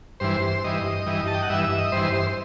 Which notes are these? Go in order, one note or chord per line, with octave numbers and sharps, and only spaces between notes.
G2 E3 C5
G2 E3 D#5
G2 E3
A5
G5
F#5
G2 E3 E5
E5
D#5
G2 E3 C5
C5